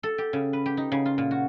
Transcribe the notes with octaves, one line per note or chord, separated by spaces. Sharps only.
A4
G4
C#3
B4
G4
D#4
C#3
F4
A#2
F#4